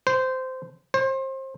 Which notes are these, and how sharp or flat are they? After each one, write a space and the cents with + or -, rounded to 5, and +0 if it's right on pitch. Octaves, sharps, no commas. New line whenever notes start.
C5 -15
C5 +30